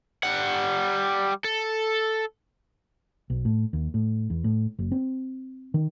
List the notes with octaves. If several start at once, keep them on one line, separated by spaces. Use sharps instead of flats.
G3 F#5
A4
B1
A2
D#2
A2
E2
A2
F#1
C4
D#3